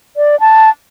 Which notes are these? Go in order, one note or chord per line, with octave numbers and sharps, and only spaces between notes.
D5
A5